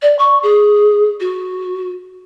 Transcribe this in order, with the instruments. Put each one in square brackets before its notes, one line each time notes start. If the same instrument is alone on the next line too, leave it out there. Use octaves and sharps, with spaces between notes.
[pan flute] D5
C#6
G#4
F#4